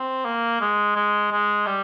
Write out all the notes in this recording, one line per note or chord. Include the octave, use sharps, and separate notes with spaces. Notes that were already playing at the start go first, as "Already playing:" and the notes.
Already playing: C4
A#3
G#3
G#3
G#3
G3